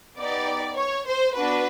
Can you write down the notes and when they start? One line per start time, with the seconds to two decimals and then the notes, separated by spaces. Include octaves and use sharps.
0.18 B3 D#4 G4 D5
0.77 C#5
1.06 C5
1.35 B3 D4 F#4 B4